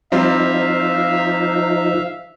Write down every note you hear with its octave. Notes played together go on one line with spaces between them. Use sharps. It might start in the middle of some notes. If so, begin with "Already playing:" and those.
F3 G3 C4 D#4 F4 E5 F5